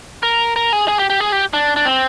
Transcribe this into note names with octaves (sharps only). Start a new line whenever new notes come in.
A#4
A#4
G#4
G#4
G4
G4
G#4
G4
D4
D4
C4